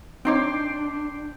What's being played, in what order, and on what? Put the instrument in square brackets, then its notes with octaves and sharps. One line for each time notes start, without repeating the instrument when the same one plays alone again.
[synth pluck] C4 D#4 C#5 [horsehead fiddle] D4 [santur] G5 C6 D6